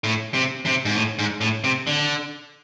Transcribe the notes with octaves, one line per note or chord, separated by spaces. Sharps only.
A2
C3
C3
G#2
A2
G#2
A2
C3
D3